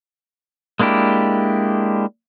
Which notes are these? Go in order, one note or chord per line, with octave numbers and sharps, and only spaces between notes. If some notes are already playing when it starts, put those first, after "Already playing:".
G#3 A#3 D4 E4 G4